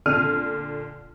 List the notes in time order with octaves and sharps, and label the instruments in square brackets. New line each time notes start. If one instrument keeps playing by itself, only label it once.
[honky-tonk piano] A#2 D3 D4 F6 D#7